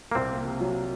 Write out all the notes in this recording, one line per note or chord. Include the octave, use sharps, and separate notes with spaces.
A#3
C2 C4
A#3
C3
F#3